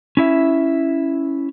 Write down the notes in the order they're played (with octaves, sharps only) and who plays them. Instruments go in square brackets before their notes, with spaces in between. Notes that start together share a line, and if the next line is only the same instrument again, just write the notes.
[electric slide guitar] C#4 E4 E5